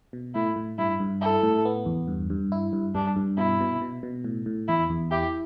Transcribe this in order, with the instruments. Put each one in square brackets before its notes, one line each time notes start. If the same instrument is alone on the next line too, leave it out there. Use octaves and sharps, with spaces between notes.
[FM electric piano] B2
[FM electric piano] A2 [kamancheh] E4
[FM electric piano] A2
[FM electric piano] G2 [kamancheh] E4
[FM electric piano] G2
[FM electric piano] E4 [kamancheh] A4
[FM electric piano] A2
B3
E2
G2
G2
E4
G2
[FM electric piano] G2 [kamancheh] D4
[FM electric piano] G2
[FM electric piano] B2 [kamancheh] E4
[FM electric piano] B2
B2
B2
A2
A2
[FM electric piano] E2 [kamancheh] E4
[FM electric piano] E2
[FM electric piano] E4 [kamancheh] G4